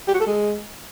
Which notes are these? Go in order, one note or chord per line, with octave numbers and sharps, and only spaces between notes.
G4
F#4
A4
G#3